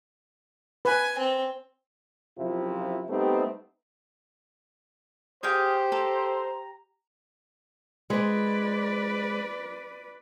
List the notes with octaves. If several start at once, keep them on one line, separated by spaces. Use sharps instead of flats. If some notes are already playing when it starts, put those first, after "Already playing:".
B4 G#5
C4
F#2 C3 F3 E4 F4
G3 A3 B3 C4 D#4 G4
G4 G#4 C5 F5 G5 D#6
A4 A#5
G#3 B4 C5 D5